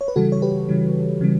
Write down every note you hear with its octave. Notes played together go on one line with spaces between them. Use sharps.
C#5
B4
C#3 E3 G3 F#4 A4
C#5
G4 B4
C#3 E3 G3
C#3 E3 G3